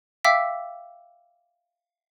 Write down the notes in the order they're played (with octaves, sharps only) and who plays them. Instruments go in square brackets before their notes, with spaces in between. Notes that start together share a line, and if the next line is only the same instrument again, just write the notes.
[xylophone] E5 F5 G5 D6 E6 B6